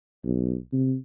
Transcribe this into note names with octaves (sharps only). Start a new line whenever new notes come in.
B1
C3